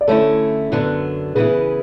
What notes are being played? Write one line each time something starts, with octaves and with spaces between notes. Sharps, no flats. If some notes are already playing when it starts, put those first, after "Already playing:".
D5
D3 A3 C#4 E4 A4 C#5
F#2 D3 F#3 B3 D4
C#3 E3 B3 E4 G#4 B4